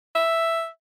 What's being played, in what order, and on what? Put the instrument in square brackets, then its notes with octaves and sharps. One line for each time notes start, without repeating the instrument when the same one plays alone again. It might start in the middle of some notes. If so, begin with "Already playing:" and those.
[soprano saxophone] E5